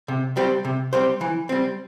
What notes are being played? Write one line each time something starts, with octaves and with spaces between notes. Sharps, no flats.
C3
G3 C4 G4 C5
C3
G3 C4 G4 C5
E3
G3 C4